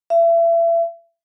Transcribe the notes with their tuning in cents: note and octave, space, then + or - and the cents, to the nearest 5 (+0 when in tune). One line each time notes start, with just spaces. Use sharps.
E5 +30